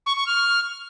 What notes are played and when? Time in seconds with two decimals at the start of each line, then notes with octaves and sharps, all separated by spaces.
0.06 C#6
0.16 C#6
0.27 F6